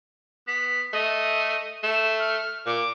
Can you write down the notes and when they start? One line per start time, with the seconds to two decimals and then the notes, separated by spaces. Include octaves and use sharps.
0.47 B3 B6
0.93 A3 D#5
1.83 A3 E7
2.19 F6
2.66 A#2 D6